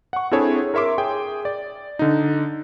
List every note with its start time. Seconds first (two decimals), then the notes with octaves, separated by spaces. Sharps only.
0.13 F#5 C#6
0.31 C4 D4 E4 G#4 A4 C#5
0.74 A#4 C#5 E5 C6 D6
0.98 G#4 G5
1.45 D5
1.99 D3 D#4